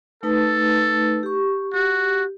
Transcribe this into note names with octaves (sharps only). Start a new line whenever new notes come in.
A3 D#4 A4 B4
G4 C#6
F#4 G4